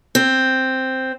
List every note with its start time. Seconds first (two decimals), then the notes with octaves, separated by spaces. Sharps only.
0.15 C4